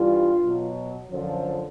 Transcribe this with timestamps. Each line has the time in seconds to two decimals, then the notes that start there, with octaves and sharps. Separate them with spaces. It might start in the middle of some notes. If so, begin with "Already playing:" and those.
Already playing: G2 E3 G3 F4
0.43 B2 F#3
1.10 F#2 D3 F3